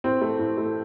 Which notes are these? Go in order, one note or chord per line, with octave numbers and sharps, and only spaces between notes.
A2 C4
A3
A2
A3